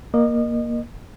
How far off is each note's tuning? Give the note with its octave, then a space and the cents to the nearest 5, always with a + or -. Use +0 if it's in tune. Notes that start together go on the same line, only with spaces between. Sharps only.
A#3 +10 D#5 -30